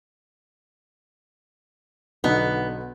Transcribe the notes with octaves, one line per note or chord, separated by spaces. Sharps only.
B1 D3 B3 D#4